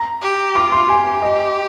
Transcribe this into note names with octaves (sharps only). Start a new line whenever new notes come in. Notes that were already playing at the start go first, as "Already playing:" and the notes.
Already playing: A#5
G4
F4 D6
C6
G4 G#5
D#5